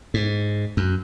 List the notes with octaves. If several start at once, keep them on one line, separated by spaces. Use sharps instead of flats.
G#2
F#2